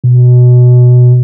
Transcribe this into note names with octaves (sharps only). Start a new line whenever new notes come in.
B2